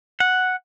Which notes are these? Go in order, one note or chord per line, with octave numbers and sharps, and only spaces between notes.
F#5